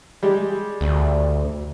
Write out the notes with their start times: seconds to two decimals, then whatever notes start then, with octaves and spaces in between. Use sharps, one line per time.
0.23 G3 G#3 G4
0.81 D2